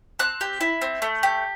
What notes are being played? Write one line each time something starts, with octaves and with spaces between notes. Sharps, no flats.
C4 F#6
G4
E4
C4
A3
G4